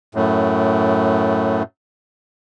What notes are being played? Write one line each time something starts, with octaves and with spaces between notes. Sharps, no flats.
F#2 A2